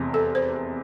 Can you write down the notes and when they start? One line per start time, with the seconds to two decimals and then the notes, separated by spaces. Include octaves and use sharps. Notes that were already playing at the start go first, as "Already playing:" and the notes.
Already playing: F1 E2 C3
0.14 A4
0.35 C5